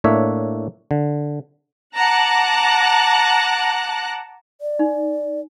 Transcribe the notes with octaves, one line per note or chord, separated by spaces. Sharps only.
A2 A#3 D4 C#5 E5
D3
F#5 A5 A#5 D6 F#6
D5
D#4